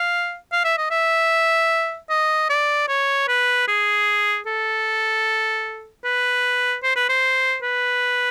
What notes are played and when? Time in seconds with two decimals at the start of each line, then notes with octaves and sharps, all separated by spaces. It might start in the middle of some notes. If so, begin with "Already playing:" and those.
Already playing: F5
0.52 F5
0.64 E5
0.78 D#5
0.91 E5
2.09 D#5
2.50 D5
2.88 C#5
3.28 B4
3.68 G#4
4.46 A4
6.04 B4
6.83 C5
6.96 B4
7.09 C5
7.62 B4